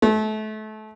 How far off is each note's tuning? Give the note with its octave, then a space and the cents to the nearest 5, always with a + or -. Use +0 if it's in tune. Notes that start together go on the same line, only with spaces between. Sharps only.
A3 -30